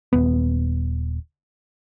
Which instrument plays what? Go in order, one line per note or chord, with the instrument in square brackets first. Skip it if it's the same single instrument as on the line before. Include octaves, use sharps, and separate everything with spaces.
[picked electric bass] D#1 B3